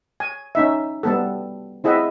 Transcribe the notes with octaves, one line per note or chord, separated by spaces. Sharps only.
G#5
C#4 D#4 E5
G3 B3 A4
C4 E4 G#4 D#5 E5 F#5